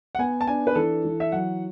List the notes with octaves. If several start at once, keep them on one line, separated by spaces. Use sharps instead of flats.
F#5
B3 G#5
A5
D4 G#5
B4
E3 A4
E3
E5
F#3 F#5